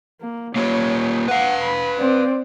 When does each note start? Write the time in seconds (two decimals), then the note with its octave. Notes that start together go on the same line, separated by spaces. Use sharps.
0.21 A#3
0.56 A#3 F4 G4 C#5
1.28 B4 F5 F#5
1.63 B5
1.98 C4 D5